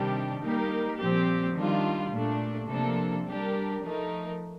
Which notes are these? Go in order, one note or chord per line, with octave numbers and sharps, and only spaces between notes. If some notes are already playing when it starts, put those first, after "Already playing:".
Already playing: C3 D#3 G3 D4 G4
G3 A#3 D#4 G4 A#4
A#2 F3 C4 G4
D#3 G3 D4 F4
A#2 A3 D4
C3 F3 A#3 D4 A4
G3 D4 G4 A#4
F3 A3 D#4 A#4